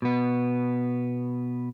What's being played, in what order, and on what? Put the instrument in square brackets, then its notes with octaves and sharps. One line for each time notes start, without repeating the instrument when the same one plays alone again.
[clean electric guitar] B2 B3